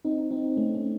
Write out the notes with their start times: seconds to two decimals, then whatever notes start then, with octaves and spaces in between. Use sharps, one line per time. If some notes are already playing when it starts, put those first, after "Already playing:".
0.05 C4 D#4
0.31 C4 D#4
0.56 A3 C#4
0.74 A3 C#4